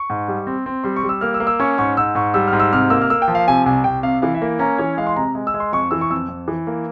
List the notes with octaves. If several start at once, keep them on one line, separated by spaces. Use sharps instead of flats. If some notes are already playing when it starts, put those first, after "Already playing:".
Already playing: C#6
G#2
G3
C4
C4
G3 C6
C#6
G3
E6
A#3 F6
E6
A#3
E6
C#4 C#6
G#2 C#6
G#2 E6
G#2 C#6
G3 E6
F6
G#2
E6
C3 F6
A#3 E6
F6
A#3 E6
G5
F3
F5
C3 G#5
C2 G#5
C2 G5
C3 F5
E3 F5
E5
A#3
C#4 A#5
E3 C#5
G#3 F5
C6
C3 A#5
G#3
E6
G#3
C6
F2 C#6
E3 E6
C#6
F2 E6
F2
E3
A#3